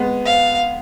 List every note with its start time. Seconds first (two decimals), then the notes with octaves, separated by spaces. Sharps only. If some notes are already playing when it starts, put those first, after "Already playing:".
Already playing: G#3 B3
0.26 F5